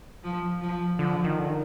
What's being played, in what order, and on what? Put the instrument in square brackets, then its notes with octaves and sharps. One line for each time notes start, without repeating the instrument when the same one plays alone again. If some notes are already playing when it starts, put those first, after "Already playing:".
[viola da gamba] F3
F3
[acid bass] D3 [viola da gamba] F3
[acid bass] D#3
D3
D#3